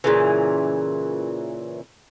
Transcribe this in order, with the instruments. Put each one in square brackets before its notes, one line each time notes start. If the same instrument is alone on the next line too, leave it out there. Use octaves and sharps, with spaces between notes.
[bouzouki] A#2 C#3 E3